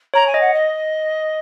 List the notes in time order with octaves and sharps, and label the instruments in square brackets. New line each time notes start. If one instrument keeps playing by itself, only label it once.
[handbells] C#5 [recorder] A#5
[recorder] G#5
[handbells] D#5
[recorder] F#5
D#5